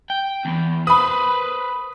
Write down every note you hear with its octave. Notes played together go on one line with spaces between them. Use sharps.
G5
E2 B3
B4 C5 B5 D#6